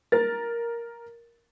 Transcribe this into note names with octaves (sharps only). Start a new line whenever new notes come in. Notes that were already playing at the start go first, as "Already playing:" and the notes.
A#4 A6